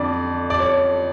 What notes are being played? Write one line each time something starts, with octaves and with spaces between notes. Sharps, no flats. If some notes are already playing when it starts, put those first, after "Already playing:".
Already playing: F2 D3 D5
D5
C#5